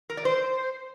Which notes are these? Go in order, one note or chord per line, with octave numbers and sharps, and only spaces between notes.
A#4
D5
C5